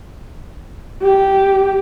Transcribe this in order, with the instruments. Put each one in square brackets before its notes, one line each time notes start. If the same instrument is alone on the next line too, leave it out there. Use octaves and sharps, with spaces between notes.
[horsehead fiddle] G4